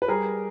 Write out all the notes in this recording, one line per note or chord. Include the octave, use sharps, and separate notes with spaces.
B4
G3 G#4 A#4